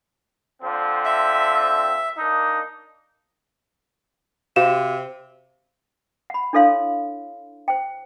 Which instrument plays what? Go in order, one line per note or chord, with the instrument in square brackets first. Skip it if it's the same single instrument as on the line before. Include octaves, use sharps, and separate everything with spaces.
[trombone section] D3 F3 C4
[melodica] E5
[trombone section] A#3 D4 D#4
[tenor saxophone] C3 [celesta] F#4 F5 E7
[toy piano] F#5 B5
D4 E4 A4 C#5 F5 C6
C5 G5